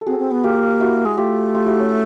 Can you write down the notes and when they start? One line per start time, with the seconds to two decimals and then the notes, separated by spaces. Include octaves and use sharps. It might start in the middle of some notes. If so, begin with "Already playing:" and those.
0.01 A4
0.06 C4 F#4 G#4
0.19 C4
0.31 B3
0.43 A#3 F4 G4
0.80 E4 F#4
1.05 G#3
1.17 A3 F4 G4
1.55 F4 G4
1.66 E4 F#4
1.79 C#4